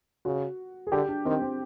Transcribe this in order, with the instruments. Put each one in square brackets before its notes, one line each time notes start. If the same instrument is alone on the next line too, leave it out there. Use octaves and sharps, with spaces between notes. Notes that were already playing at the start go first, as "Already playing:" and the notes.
[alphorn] C#3 [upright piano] F#4
[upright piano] G#4
[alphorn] D3 [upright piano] G4
[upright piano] D4
[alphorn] D#3 [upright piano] C4
[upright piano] C4